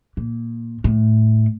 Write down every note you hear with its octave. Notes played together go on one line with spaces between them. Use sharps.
A#2
A2